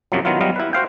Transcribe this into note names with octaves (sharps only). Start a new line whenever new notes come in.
F#2 C3 F3 F#3
D#3 F#3 B3 E4 F4
F#3 G3 B3 D#4 F5 A#5
E4 B4
F#4 C5 F5 G5